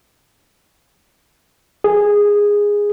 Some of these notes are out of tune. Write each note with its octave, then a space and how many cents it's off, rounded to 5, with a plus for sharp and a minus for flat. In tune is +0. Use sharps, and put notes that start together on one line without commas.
G#4 -10